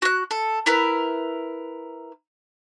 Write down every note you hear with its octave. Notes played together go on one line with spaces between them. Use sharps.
F#4 F#6
A4
E4 A#4 B4